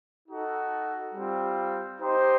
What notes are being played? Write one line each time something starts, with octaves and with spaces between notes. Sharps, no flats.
D#4 F#4 A4
G3 C4 F4
D#4 G4 C5